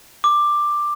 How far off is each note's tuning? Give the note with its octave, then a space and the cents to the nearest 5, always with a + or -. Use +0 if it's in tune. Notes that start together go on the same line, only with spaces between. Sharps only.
D6 +10